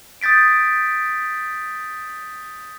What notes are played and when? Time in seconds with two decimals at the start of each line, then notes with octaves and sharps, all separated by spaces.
0.21 D#6 G6 A6 B6 D7